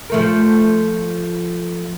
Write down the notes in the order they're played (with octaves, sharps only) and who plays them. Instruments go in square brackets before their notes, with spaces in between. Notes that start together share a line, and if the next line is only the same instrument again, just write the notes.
[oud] F3 A3 A#4